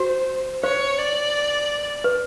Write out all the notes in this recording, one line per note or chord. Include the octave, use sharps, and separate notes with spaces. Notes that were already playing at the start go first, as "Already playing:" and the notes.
Already playing: F#4 C5
C5 C#5
D5
B4